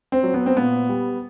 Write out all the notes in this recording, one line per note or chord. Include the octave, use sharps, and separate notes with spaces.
C4
F#3
B3
C4
A#2 B3
G3